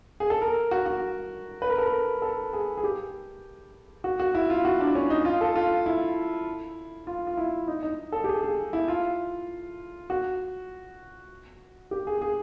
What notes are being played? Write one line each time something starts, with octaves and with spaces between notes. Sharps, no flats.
G#4
A4
A#4
F#4
F#4
B4
A#4
A4
A#4
A4
G#4
G#4
G4
F#4
F#4
E4
F4
F#4
D4
C#4
D#4
F4
A4
F4
E4
F4
F4
E4
D#4
D#4
A4
G4
G#4
G#4
E4
F4
F#4
G4
G#4
G#4